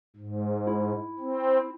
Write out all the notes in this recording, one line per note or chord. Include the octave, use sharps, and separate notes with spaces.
G#2
E4
C4